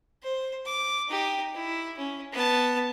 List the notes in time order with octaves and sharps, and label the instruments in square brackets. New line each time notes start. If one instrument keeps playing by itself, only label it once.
[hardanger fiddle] C5
D6
D#4 G4
E4
C#4
B3 A5